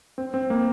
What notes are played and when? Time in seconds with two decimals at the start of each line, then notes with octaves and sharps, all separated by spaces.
0.18 C4
0.34 C4
0.50 A#3